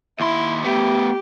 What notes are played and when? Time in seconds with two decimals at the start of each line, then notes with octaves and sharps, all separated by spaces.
0.20 D#2 E4 C6
0.64 A3 B3 G4